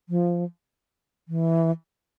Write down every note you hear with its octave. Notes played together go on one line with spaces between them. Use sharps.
F3
E3